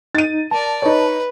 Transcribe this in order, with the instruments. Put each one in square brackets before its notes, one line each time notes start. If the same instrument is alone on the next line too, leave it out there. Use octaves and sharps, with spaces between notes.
[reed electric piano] D#4 [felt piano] A6 D#7
[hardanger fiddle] A#4 D5 [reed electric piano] A5
[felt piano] D#4 C#5 [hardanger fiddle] B4